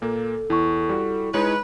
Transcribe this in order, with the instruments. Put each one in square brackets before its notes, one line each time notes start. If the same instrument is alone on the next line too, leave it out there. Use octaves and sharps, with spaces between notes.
[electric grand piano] A#2 A#3 [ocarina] A4
[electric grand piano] E2 [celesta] E4 C#6
[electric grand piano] G3 F#4
[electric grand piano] G#3 D#4 C#5 [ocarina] E4 [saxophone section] B4